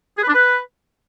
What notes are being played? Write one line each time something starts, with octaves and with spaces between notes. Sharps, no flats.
G#4
B4
D4
B4